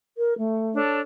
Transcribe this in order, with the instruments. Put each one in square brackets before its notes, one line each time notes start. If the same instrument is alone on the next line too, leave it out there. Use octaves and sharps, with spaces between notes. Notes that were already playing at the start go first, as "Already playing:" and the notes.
[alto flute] A#4
A3
[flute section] D4 A4 C#5